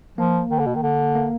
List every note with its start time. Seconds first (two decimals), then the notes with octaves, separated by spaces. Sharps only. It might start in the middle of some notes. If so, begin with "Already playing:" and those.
0.18 F3 A#3
0.51 D#3
0.59 D3
0.67 B2
0.75 D#3
0.83 D3
1.15 A#3